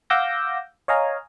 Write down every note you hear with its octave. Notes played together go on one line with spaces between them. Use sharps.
F5 F#5 D6 E6 G6 A#6
C#5 D#5 F5 G#5 A#5